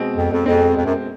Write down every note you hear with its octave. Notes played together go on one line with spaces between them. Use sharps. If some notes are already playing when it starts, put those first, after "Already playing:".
Already playing: B2 G#3 C4
F2
F2
F2 B2 G#3 C4
F2
F#2